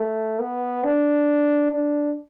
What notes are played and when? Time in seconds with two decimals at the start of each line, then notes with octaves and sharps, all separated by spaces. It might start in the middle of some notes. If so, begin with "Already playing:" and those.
Already playing: A3
0.39 B3
0.84 D4
1.71 D4